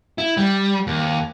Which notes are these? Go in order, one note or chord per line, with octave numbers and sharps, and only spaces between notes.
E4
G3
D#2